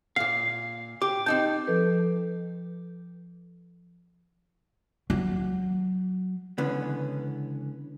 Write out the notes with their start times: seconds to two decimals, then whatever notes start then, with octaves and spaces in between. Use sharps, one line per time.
0.16 A#2 F5 C7
1.02 G4 D6
1.26 C4 D#4 A5 G6
1.67 F3 A4 B4
5.10 F#3
6.58 C#2 D3 E3 B3 C#4